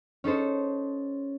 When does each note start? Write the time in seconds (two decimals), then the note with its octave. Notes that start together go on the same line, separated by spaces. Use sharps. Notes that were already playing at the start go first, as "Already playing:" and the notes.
0.24 C#4 D#4 A4 C5